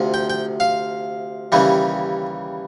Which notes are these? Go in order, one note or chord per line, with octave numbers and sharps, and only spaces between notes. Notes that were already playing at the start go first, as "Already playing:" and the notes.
Already playing: D2 C3 F3
G5
G5
F5
D#2 C#3 E3 G3